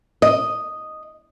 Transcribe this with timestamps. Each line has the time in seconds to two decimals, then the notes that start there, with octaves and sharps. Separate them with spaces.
0.22 D#5